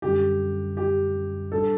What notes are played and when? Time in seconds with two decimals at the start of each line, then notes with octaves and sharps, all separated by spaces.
0.02 F#2 D3 G3 G4
0.77 G4
1.52 A2 G3 D4 A4